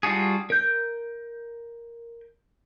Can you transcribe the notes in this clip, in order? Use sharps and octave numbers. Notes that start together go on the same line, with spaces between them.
G3 D4 F4 F#4 G#4
A#4 G6